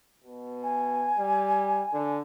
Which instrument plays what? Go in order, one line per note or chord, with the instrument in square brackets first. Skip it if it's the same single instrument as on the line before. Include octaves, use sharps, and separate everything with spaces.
[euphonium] B2
[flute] G#5
[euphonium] G3
D3